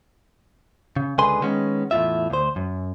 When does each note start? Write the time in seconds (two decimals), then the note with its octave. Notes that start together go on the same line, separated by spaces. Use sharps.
0.96 C#3
1.18 C#2 D3 G#4 B4 G#5 C6
1.42 D#3 G#3 B3 C#4
1.91 E2 A2 F4 E5
2.30 D2 C5
2.56 F#2